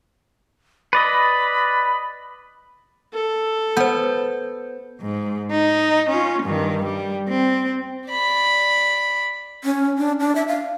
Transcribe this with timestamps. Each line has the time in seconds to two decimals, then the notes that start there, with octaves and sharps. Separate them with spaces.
0.93 B4 D5 D#5 B5
3.13 A4
3.77 B3 C5 G6
5.01 G#2
5.51 D#4
6.09 C#4 F4
6.43 G2 D#3
6.84 G3
7.29 C4
8.10 D5 B5
9.64 C#4
9.98 D4
10.20 D4
10.35 E5
10.47 F5